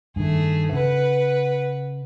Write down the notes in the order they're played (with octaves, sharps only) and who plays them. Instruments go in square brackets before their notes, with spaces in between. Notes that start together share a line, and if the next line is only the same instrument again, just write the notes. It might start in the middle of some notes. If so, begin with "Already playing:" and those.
[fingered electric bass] G2 D#3 [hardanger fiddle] A3 G#4
[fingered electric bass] C#3 [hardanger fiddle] B4 F#5